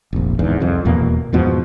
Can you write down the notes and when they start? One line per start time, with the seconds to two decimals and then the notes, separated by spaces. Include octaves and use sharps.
0.13 F1 A#1
0.39 D1 E2 G#2
0.61 C2 F2
0.85 D#1 E2 B2 A#3
1.33 E2 G#2 B2 F3